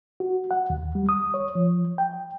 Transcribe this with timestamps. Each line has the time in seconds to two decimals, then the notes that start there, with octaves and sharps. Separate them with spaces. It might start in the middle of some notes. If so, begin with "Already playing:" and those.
0.20 F#4
0.51 F#5
0.70 D#2
0.95 G3
1.09 D#6
1.34 C#5
1.55 F3
1.98 G5